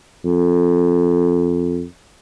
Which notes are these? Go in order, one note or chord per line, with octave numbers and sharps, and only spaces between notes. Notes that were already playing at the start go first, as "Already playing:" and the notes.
F2